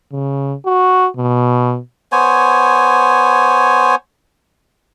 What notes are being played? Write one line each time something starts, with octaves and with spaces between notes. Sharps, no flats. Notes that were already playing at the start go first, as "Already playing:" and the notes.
C#3
F#4
B2
B3 C5 C#5 G#5